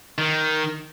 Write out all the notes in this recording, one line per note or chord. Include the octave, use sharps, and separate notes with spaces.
D#3